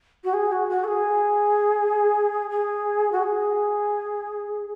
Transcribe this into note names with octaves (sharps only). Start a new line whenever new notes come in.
F#4
G#4
F#4
F#4
A4
G#4
G#4
F#4
G#4